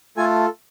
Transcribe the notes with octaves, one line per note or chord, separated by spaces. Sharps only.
A3 F4 A4 G#5